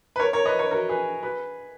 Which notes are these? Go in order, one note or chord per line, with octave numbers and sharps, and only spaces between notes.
B4
A#4 C#5
A#4 C#5
B4 D#5
A#4 C#5
F#4 A#4
G#4 B4
G#4 B4